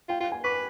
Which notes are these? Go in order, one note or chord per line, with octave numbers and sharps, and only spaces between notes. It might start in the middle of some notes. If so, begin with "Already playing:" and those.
F4 G5
F4 G5
G#5
B4 D6